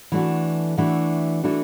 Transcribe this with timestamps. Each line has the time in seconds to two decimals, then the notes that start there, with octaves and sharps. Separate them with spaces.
0.12 E3 A3 D4 F#4
0.77 E3 A3 D4 F#4
1.43 E3 A3 D4 F#4